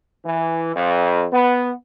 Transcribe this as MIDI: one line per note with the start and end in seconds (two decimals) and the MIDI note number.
0.25 0.72 52
0.74 1.24 41
1.32 1.70 59